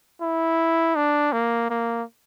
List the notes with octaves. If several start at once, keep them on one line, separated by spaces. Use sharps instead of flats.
E4
D4
A#3
A#3